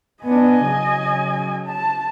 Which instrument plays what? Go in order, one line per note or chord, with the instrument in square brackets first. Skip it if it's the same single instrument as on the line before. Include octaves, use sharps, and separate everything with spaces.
[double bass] B3 D4 [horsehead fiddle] D#5 G#5
[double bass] C#3 F#3
[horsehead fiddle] A5